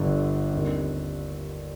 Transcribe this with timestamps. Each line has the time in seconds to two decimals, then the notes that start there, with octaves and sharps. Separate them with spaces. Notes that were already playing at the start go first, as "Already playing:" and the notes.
Already playing: G1 G2 D3
0.54 D#2 D3 G3 C4 D#4